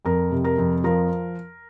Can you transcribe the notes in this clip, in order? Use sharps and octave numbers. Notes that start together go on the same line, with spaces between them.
F2 A#4
C3
A#4
F2
F3 A#4